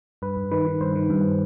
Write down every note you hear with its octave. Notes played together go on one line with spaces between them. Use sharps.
G2 B4
G2
D#3 B4
D#3
G2 C5
D#3
G2